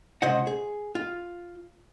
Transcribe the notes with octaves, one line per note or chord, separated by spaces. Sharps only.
C#2 C3 C5 D#5 F#5
G#4
F4